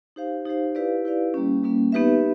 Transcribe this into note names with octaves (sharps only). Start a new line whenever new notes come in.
D#4 G4 C5 F5
D#4 G4 C5 F5
E4 G4 B4 D5 F5
E4 G4 B4 D5 F5
G3 A#3 C#4
G3 A#3 C#4
B3 D#4 G4 B4 E5